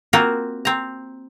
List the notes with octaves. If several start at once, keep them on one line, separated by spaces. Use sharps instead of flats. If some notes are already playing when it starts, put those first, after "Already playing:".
A#3 C4 F4 F#4 A#4
C4 A#5